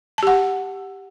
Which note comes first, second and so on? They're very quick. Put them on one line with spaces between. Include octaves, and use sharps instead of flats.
A5 G4 F#5